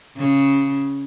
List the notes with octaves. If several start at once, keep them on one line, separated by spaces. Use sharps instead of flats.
C#3